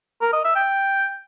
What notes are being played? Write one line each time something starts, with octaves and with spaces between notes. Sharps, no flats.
A#4
D#5
E5
G5